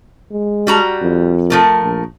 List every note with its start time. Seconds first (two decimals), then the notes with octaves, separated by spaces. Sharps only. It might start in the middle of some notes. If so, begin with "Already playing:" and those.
0.31 G#3
0.67 G3 F#4 A#5
1.02 F2
1.50 F3 A3 A#4
1.83 A#1